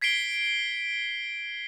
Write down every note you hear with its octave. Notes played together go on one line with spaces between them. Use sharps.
G#6 B6 C7 D7 G7